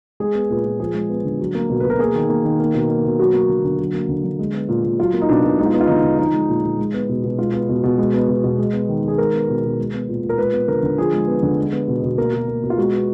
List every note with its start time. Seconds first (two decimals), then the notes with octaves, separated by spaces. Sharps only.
0.20 G#3 G#4
0.35 B3
0.50 A#2 B4
0.65 A#2
0.80 F3 G#4
0.94 G#3
1.09 B3
1.25 D3
1.39 F#3
1.55 A#3
1.70 B2
1.80 B2 B4
1.90 A#4
1.99 A#3 G#4
2.15 D#3
2.29 A#3
2.45 D#3
2.60 A#3
2.74 B2
2.90 A#3
3.05 B2
3.19 F#3 F#4
3.34 A#3
3.49 D3
3.64 D3
3.79 F#3
3.94 A#3
4.09 D3
4.25 D3
4.39 G#3
4.54 B3
4.69 A#2
4.84 A#2
4.99 F#3 F4
5.14 A#3
5.21 D#4
5.29 B2 D4
5.44 B2
5.59 G#3 D#4
5.66 F4
5.73 B3 D#4
5.81 F4
5.87 D3 D#4
6.03 D3
6.18 F3 D#4
6.34 G#3
6.49 A#2
6.64 A#2
6.79 G#3
6.94 B3
7.09 B2
7.24 B2
7.38 G#3 F4
7.53 B3
7.69 B2
7.83 B2
7.98 G#3
8.14 B3
8.28 B2
8.44 B2
8.58 G#3
8.73 B3
8.89 D#3
9.03 D#3 G#4
9.18 G#3 A#4
9.33 B3
9.49 B2
9.63 B2
9.79 G#3
9.93 B3
10.08 A#2
10.23 A#2
10.29 A#4
10.38 G#3 B4
10.53 B3
10.68 D3 A#4
10.83 D3
10.98 F3 G#4
11.13 G#3
11.28 B3
11.43 D3
11.58 G#3
11.72 B3
11.88 B2
12.03 B2
12.18 A#3 A#4
12.33 B2
12.48 A#3
12.63 B2
12.70 F4
12.78 G#3 F#4
12.93 B3